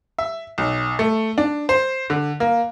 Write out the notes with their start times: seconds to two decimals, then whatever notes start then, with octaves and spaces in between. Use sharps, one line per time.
0.19 E5
0.58 B1
0.99 A3
1.38 D4
1.69 C5
2.10 D3
2.40 A#3